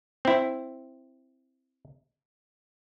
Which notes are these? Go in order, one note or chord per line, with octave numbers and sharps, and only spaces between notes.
C4 E4